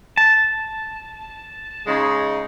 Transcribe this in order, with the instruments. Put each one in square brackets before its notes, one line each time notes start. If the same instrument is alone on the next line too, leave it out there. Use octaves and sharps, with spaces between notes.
[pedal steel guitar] A5
[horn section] C#3 G#3 D#4